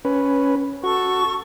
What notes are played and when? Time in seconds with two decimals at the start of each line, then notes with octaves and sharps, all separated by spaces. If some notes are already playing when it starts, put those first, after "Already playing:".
0.05 C#4 B4
0.83 F#4 A4 C#6